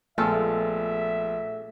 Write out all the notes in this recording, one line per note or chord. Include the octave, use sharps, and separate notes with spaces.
A#1 G#3 A3 B3 F4 A4 E5 E6